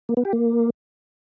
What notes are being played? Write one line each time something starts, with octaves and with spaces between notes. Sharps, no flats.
A#3
B3
G4
A#3